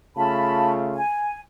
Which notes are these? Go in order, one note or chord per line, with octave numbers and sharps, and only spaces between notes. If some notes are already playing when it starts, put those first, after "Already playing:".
C#3 A3 F4 A5 B5
G#5